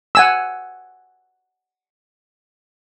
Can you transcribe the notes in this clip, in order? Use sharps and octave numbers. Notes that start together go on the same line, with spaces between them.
F#5 G#5 E6